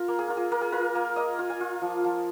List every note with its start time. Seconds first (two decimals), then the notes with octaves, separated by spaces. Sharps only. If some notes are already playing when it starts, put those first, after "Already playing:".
Already playing: F4 A#4
0.08 A#3
0.19 G#4
0.28 F4 A#4
0.37 G#4
0.52 A#3 A#4
0.61 G#4
0.72 F4 A#4
0.95 A#3
1.16 A#3 D#5
1.39 F4
1.50 G#5
1.60 F4
1.82 F3
2.04 F3